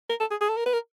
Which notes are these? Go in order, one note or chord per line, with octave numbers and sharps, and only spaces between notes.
A#4
A4
G#4
G#4
A4
A#4
B4
A#4